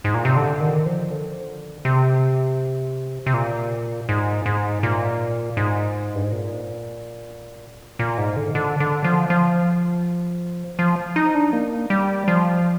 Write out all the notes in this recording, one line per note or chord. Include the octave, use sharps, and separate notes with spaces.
G#2
A#2
C3
D3
D#3
F3
D3
C3
C3
A#2
G#2
G#2
A#2
G#2
G2
G#2
A#2
A#2
G#2
D3
D3
D3
F3
F3
F3
D#4
D4
A#3
G3
F3